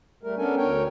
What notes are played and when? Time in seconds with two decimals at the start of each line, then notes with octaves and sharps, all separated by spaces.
0.23 G3 A3 A#4
0.38 B3 C#4 D4 A4 A#4 G#5
0.57 D2 A#4 C#5 G5